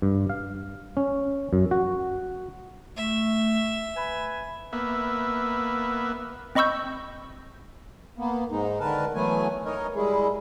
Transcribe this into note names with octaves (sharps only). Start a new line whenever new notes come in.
G2
F5
C#4
F#2
F#4
A3 E5
B4 G#5 B5
A#3 B3 E5
C4 D#5 B5 C#6 E6 G6
A#3 B3
G#2 G#3 D#4
D3 D#3 A#4 B4 A5
E3 F#3 A3 B3 G#5
D#4 A#4 C#5 D#5
G3 G#3 E4 G#4